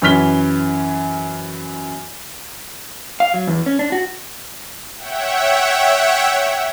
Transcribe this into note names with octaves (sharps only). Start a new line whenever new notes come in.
F#2 E3 C#4 F6 B6 G7
F5
F#3
E2
C#4
D4
F#4
C#5 E5 F#5 G5